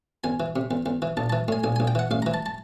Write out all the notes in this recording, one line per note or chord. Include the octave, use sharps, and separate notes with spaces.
E2 G#5
E3
C3
E2
E2
E3
A#1 A5
E3 A5
A2 G#5
A#1 G#5
G#5
A#1
G5
E3 F#5
A1 F5
A#5
E3
A5
A5